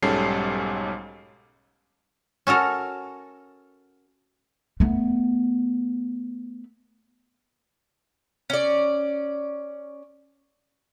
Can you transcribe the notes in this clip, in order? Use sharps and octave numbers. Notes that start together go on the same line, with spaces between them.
B1 G#2 G3 C#4 A4 C7
C#4 F#4 A4 A#4
A3 B3
C#4 D5